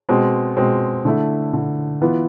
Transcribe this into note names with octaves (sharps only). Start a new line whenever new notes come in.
B2 G#3 C4
B2 G#3 C4
D3 A3 E4
D3 A3 E4
E3 B3 F4